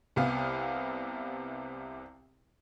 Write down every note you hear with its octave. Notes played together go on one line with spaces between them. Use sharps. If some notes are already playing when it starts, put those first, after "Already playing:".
C2 C3 B3 F5